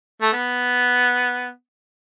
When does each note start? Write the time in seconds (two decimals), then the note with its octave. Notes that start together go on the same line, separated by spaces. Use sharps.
0.21 A3
0.32 B3